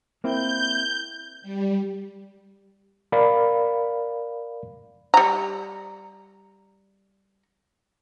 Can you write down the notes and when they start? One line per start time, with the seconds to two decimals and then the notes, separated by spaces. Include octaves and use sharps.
0.24 A#3 C4 E4 G6
1.42 G3
3.12 A#4 D5 F5 B5
5.14 G3 A#5